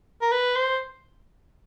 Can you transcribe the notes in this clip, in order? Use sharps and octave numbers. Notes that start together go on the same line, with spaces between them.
A#4
B4
C5